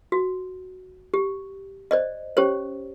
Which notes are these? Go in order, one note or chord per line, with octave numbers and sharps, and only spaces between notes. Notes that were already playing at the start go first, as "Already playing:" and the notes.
F#4
G4
C5 D5 D#5
C#4 G4 C5 C#5